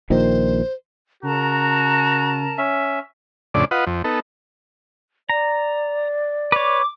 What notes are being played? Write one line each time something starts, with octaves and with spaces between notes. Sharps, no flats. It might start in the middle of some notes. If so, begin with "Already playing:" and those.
A#1 A#2 D#3 C5
C#3 F#4 A#4 A5 A#5
C#4 E5
F2 A2 C#3 D4 D5
F4 B4 D#5 F#5
F2
B3 D#4 A4
D5 A#5
B4 C#5 D6